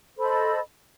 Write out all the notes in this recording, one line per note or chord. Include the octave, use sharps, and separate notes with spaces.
A4 C5 D#5 B5